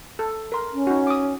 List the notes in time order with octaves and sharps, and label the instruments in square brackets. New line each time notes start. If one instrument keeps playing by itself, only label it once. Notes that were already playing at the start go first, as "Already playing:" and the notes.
[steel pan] A4
A#4 C6
[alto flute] C#4
[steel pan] D#4 F#4
D6 D#6